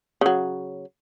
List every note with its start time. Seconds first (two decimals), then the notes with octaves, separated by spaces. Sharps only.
0.21 C#3 F#3